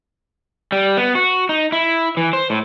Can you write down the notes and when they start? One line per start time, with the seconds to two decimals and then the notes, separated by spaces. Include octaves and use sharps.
0.72 G3
0.97 B3
1.15 F#4
1.49 D#4
1.72 E4
2.17 E3
2.33 C5
2.50 A2